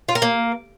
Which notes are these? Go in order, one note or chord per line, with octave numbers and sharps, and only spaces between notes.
F4
A#4
A#3